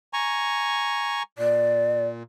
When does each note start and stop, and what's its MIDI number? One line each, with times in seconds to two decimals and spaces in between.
0.13 1.23 80
0.13 1.23 82
0.13 1.23 85
1.39 2.23 46
1.39 2.07 74